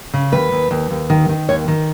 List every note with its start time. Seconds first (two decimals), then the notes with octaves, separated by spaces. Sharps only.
0.14 C#3
0.32 D#2 B4
0.52 D#2
0.71 D#2
0.90 D#2
1.10 D#3
1.29 D#3
1.49 D#2 C#5
1.68 D#3